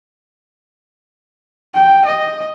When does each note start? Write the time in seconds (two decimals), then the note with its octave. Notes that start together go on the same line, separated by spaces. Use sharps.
1.74 G5
2.06 D#5